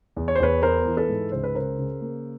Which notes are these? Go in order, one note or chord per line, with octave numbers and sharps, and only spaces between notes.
E2
C#5
C5
E2 B4 C#5
B3 A#4 C5
E3
A4 B4
G#2
C#2 C5
B4
C#3 A#4 C5
C#3
A#3